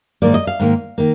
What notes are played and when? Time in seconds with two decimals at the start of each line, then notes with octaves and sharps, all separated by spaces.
0.22 G#2 D#3 A#3 D5
0.34 D#5
0.47 F5
0.60 G#2 D#3 A#3
0.98 D#3 A#3